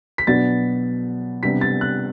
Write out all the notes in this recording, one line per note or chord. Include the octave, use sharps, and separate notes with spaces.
B6
B2 F#3 B3 D4 A6
C3 G3 B3 D4 B6
A6
F#6